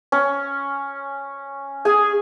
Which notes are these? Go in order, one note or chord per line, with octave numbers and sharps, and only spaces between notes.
C#4
G#4 G#5